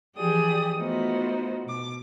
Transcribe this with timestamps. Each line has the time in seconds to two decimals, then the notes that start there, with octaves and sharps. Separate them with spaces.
0.16 E3 F3 G4 G#4 D5 D#6
0.77 A3 B3 D#4 F4 F#4 C5
1.65 B2 D6